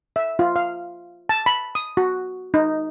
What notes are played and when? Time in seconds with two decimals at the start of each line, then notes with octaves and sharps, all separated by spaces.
0.16 E5
0.39 F4
0.56 F5
1.29 A5
1.46 B5
1.75 D#6
1.97 F#4
2.54 D#4